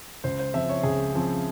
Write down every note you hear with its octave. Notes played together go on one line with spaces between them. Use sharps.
C#2 C5
C5
C#3 F3 C4 E5
C#5
C#2 G#4
C#3 F3 C4